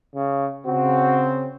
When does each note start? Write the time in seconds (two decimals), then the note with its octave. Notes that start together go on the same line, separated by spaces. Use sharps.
0.15 C#3
0.67 C#3 C4 F#4